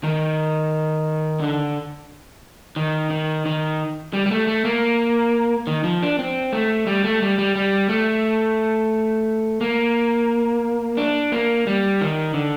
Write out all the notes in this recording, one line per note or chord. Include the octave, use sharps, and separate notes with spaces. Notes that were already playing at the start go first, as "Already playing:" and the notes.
D#3
D3
D#3
D#3
D#3
G3
G3
A3
A3
A#3
D#3
F3
D4
C4
A3
G3
A3
G3
G3
G3
A3
A#3
D4
A#3
G3
D#3
D3